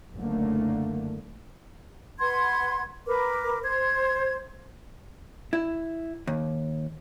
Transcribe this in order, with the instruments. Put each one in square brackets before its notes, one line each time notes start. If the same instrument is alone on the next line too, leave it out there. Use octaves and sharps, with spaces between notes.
[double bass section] F#1 D3 A3 A#3
[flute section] B4 F#5 C6 G#6
A#4 B4 D6
C5 G#6
[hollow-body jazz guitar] E4
D#2